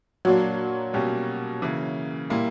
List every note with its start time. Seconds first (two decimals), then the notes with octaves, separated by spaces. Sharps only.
0.25 A#2 F#3 A#3 D4
0.93 B2 G3 A#3 C#4 G4
1.62 C#3 E3 A#3
2.30 A#2 G3 A#3 E4